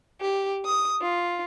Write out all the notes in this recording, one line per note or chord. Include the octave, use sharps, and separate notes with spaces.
G4
D#6
F4